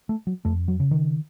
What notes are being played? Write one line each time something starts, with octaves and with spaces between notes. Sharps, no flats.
A3
F#3
F2 A3
F#3
C#3
D#3